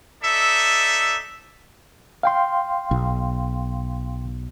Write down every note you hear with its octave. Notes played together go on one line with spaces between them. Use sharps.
D#4 A4 D5 E5
F5 G5 C6
B1